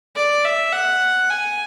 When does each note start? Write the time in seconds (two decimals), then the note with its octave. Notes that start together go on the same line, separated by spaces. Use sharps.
0.16 D5
0.45 E5
0.73 F#5
1.30 G#5